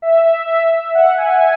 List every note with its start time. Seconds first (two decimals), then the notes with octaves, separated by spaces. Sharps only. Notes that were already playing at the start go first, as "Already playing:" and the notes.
0.02 E5
0.25 E5
0.48 E5
0.72 E5
0.95 F#5
1.18 G#5
1.41 G#5